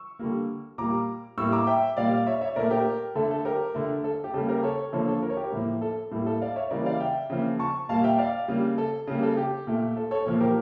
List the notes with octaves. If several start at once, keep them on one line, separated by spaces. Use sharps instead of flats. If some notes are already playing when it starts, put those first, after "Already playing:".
Already playing: C#6 E6
D3 G3 A#3
A#2 G3 A#3 A#5 D6
A2 G3 A#3 C#6 E6
A#5 D6
E5 G5
A#2 G3 A#3 D5 F5
C#5 E5
C#5 E5
A#2 A3 A#4 D5
G4 A#4
D3 A3 A4
A4
G4 A#4
D3 A3
A4
G4
C#3 G3 A#3 A4
G4 A#4
A4 C#5
D3 F3 A#3 A4 C#5
A4 C#5
A#4
C#5
G4 A#4
A2 F3 A#3
A4
A2 G3 A#3
A4
D5 F5
C#5 E5
C#3 E3 G3 A#3 A#4 D5
D5 F5
E5 G5
C#3 F3 A#3
A5 C#6
A#2 G3 A#3 F5 A5
E5 G5
D5 F5
C#3 G3 A#3
A4
C#3 G3 A#3
A4
G4
A#2 A3
A4
A4 C#5
A#2 F3 A#3
G4 A#4